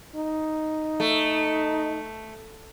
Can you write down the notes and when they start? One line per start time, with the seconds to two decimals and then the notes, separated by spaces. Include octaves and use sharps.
0.15 D#4
1.00 A3